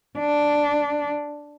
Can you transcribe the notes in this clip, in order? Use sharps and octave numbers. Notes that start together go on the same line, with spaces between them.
D4